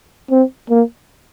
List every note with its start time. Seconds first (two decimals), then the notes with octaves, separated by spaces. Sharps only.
0.31 C4
0.70 A#3